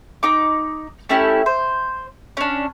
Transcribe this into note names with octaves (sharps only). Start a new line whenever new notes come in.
D#4 D6
A3 C#4 E4 G4
C5
C#4 D4